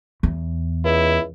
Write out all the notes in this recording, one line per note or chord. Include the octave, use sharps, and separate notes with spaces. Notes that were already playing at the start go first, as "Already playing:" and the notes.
E2
C#2 E4